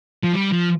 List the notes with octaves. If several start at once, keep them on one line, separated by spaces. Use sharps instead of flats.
F3
G3
F3